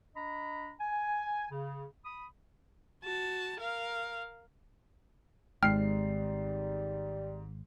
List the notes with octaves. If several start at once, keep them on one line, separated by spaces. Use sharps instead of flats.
D4 D#5 A#5 B5
G#5
C#3
B5 D#6
F#4 A5
A#4 F5
G#1 G#2 G3 G5 F6 C7